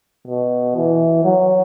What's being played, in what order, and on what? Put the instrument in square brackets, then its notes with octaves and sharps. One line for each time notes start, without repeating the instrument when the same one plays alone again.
[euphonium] B2
E3
F#3